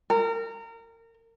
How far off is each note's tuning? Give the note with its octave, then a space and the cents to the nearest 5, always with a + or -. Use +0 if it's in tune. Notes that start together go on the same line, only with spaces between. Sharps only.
A#4 -30